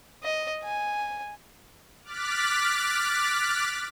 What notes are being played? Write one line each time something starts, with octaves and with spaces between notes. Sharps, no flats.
D#5
G#5
D6 F6 F#6 A6 B6